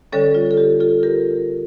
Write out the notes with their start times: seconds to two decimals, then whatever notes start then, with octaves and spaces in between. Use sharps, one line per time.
0.12 D3 G3 C#4 A4 C#5
0.35 F4
0.51 A4
0.57 G4
0.80 F4 A4
1.03 G4 A#4